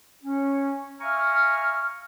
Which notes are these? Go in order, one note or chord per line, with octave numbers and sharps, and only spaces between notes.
C#4
E5 F5 G#5 A#5 C#6 F6